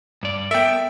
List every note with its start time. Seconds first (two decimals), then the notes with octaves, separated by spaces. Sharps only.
0.23 G2 D5
0.51 B3 A4 A#4 E5 G5